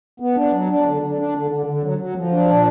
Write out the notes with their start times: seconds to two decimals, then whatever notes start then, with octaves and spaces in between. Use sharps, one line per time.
0.20 B3
0.36 D4
0.52 F#3
0.68 D4
0.85 D3
1.02 D3
1.18 D4
1.34 D3
1.51 D3
1.66 D3
1.83 F#3
1.98 F#3
2.15 F3
2.32 D4
2.48 A#2